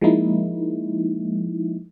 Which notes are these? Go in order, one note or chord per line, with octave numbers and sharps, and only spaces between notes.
F3 G#3 A#3 D#4 E4